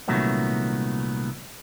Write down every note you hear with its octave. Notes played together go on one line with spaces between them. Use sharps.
C2 A#2 D#3 F#3 A3 B3